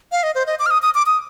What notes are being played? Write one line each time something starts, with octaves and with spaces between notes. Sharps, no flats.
F5
D#5
C5
D#5
D6
F6
D#6
D#6
D6
D#6